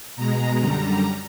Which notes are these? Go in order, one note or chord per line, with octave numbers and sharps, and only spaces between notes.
B2 G#3 A#5
F#2 D3 G3 A#5